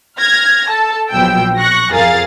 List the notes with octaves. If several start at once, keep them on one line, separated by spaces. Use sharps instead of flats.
F6 G#6 A#6
A4 A5
A#1 B2 F3 F#3 G5 E6
C#6 F#6 A#6
F2 G#4 A#4 F5 A6